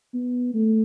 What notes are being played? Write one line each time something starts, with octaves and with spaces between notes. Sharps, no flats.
B3
A3